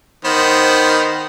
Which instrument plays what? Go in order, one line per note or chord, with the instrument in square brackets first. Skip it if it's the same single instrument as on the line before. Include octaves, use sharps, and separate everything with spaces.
[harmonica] D#3 B3 C5